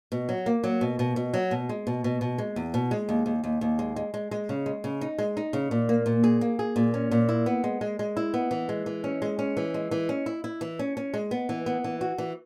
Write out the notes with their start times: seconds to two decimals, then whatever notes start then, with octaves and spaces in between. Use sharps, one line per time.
0.12 B2
0.29 F#3
0.46 A#3
0.64 F#3
0.81 B2
0.99 B2
1.16 B2
1.34 F#3
1.51 B2
1.69 G#3
1.87 B2
2.04 B2
2.21 B2
2.38 G#3
2.56 E2
2.74 B2
2.91 G#3
3.09 D#2
3.26 D#2
3.44 D#2
3.61 D#2
3.79 G#3
3.96 G#3
4.14 G#3
4.31 G#3
4.49 C#3
4.66 G#3
4.84 C#3
5.01 D#4
5.18 G#3
5.37 D#4
5.53 C#3
5.71 A#2
5.89 A#3
6.06 A#2
6.24 G#4
6.41 A#3
6.59 G#4
6.76 A#2
6.94 C#4
7.11 A#2
7.29 E4
7.46 B3
7.64 G#3
7.81 G#3
7.99 G#3
8.17 E4
8.34 B3
8.51 E3
8.69 G#3
8.86 E3
9.04 C#4
9.22 G#3
9.39 C#4
9.57 E3
9.74 G#3
9.91 E3
10.09 C#4
10.26 E4
10.44 E4
10.61 E3
10.79 C#4
10.97 C#4
11.14 G#3
11.31 B3
11.49 E3
11.66 B3
11.84 E3
12.01 F#4
12.18 E3